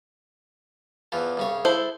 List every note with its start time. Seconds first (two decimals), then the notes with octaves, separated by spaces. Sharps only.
1.12 E2 E3 F3
1.37 C2 C#3 C#5
1.65 E4 A4 C5